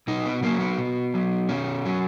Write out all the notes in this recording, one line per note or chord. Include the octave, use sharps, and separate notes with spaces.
B2 D#4
B3
F#3 A#3
B3
B2
F#3
B2 C#4
F#3